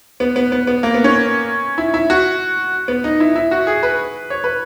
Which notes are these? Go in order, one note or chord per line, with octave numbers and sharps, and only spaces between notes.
B3
B3
B3
B3
A#3
B3
C#4
E4
E4
F#4
B3
D#4
E4
E4
F#4
G#4
B4
C#5
B4